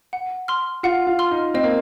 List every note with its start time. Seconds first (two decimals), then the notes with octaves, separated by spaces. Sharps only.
0.13 F#5
0.48 C6 F6
0.83 F4 F#5
1.07 F4
1.19 C6 F6
1.31 D#4
1.54 C4 D#5
1.64 A#3